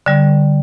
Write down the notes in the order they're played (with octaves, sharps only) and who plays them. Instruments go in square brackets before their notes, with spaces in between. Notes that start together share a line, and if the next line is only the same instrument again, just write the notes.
[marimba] D3 G3